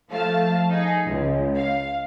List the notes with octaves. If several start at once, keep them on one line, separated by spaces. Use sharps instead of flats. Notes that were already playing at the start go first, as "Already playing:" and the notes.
F3 A3 F5 A5
D#4 G#4
C#2
F5